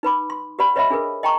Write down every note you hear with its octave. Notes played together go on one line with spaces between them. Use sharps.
D#4 B4 B5 D6
C6
G4 B4 D5 F#5 B5
B4 C#5 D#5 E5 F#5 B5
D4 G#4 A#4 B4
D#5 G5 A5 A#5 C#6